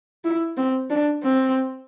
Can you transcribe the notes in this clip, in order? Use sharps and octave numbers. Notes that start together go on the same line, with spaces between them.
E4
C4
D4
C4